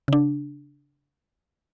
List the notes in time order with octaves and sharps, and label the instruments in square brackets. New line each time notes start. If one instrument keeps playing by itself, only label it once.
[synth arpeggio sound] C#3 D4